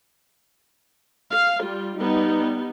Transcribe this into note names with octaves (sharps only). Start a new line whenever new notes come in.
F5
G3 F4
G3 B3 D#4